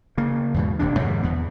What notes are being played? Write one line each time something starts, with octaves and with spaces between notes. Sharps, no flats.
C#3 A#3
E2 G#2 B2
D#1 D#2 C3 D4
F2 G#2 B2 D#3
E2 B3